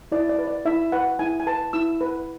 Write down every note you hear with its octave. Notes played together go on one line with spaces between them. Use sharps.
E4 D5
D5
B4
D5
E4 E5
B4 F#5
E4 G#5
G#5
B4 A5
E4 E6
B4